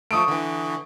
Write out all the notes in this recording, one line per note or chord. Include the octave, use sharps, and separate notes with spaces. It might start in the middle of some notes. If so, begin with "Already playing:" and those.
F3 A3 C#6 D#6 D7
D3 E3